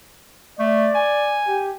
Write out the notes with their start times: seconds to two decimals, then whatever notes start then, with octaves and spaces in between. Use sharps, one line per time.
0.59 A3 D5
0.95 G#5
1.47 G4